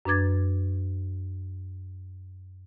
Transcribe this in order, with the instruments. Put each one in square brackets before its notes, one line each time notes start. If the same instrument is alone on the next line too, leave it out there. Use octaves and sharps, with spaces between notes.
[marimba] F#2 D4 B4 D6 G#6 A6